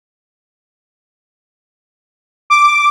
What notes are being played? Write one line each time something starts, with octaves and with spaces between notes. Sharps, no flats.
D6